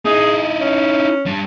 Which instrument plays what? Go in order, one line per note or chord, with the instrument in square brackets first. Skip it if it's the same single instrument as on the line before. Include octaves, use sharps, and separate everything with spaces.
[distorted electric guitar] D#4 E4 [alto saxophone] G#4
[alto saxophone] C#4
[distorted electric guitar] G3 D4